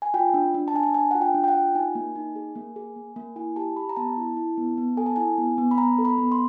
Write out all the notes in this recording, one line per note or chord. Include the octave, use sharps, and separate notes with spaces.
G#5
F4 G5
D4
D4
A5
D4 G#5
A5
D4 G#5
F4 F#5
G5
D4
G5
F#5
F4
D#4 G#5
A#3
D#4
G#4
A#3
G#4
A#3
A#3
E4 G#5
G4 A5
G4 B5
A#5
B3 A5
E4
E4
B3
B3
A4 G#5
A5
E4 G#5
B3
B3
B5
B3 A#5
A4
B5
B3
C6